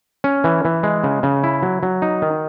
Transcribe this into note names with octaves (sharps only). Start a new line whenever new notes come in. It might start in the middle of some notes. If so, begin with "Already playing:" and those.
C#4
E3
E3
G#3
C#3
C#3
E4
F#3
F#3
D#4
D#3